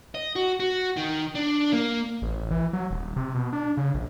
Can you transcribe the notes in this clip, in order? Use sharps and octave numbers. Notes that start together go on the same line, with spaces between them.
D#5
F#4
F#4
D#3
D4
A#3
A1
E3
F#3
D#1
C3
B2
D4
C#3
A#1